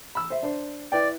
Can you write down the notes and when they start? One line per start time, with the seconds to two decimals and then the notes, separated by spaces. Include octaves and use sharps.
0.15 B5 E6
0.30 C5 E5
0.43 D4 C5
0.92 E4 B4 D5 G5